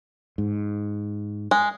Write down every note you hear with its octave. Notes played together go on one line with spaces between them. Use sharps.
G#2
G#3